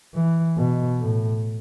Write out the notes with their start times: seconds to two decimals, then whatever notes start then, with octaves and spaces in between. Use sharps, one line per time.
0.15 E3
0.57 B2
1.00 A2